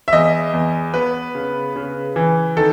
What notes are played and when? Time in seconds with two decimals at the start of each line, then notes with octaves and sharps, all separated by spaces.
0.08 E5
0.13 E2 D#5
0.53 E2
0.94 B3 B4
1.35 C#3
1.76 C#3
2.16 E3
2.57 D#3 A4